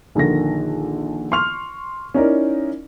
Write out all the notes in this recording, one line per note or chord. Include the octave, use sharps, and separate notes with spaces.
A#1 D3 D#3 A#6
C6 C#6 F6 F7
C#4 D#4 E4 A#4 D5